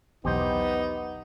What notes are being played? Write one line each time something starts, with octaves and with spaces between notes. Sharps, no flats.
B1 E2 B3 D#4 G4 C5 G5